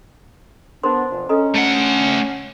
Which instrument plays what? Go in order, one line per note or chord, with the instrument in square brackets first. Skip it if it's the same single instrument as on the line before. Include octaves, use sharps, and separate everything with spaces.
[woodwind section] B3 D4 [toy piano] A#4 C5 C6
[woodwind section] F2 A#2 E3
[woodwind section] C#4 [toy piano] A4 D#5 A#5
[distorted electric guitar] A3 F#5